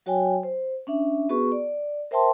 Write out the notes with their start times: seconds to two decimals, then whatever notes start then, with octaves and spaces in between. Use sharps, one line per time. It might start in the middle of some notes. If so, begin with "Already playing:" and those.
0.06 F#3 F#4 C#5 G5 G#5
0.43 C5
0.87 C#4 D4 E5
1.29 B3 F#4 G#4 B4 C#6
1.52 D5
2.11 A#4 C5 E5 G5 A5 C6